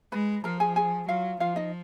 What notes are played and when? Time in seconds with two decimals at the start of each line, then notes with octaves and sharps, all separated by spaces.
0.12 G#3 B4 B5
0.44 F3 A#4 A#5
0.60 G#4 G#5
0.76 G#4 G#5
1.08 F#3 F4 F5
1.40 F3 F4 F5
1.56 D#4 D#5